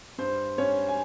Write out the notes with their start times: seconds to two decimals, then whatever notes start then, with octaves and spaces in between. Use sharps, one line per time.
0.18 G2 C5
0.58 G2 C#4 C#5
0.88 G#5